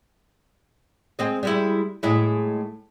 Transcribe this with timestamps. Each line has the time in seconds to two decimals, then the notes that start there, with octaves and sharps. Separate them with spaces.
1.19 G#3 C4 D#5
1.43 G3 G#3 E4
2.03 A2 G#3 E4